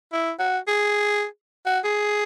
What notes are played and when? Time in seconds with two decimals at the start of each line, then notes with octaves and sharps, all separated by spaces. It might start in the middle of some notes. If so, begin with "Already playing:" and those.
0.13 E4
0.39 F#4
0.68 G#4
1.66 F#4
1.84 G#4